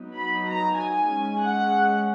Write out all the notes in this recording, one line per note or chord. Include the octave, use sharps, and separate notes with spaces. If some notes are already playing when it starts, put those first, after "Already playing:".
Already playing: F#3 B3 D#4
B5
A#5
G#5
G#3 C#4
F#5